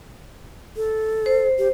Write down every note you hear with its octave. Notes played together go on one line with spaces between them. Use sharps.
A4
C5
G4